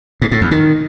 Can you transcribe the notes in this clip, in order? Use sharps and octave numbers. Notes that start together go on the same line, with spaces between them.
G#2
A2
E2
D#3